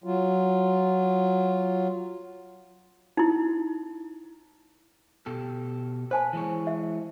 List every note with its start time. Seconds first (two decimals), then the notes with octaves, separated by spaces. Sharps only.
0.04 F#3 F4
3.17 D#4 E4
5.26 B2 G4 A4
6.11 B4 C5 G#5 A5
6.33 E3 G#3 C#5
6.67 E5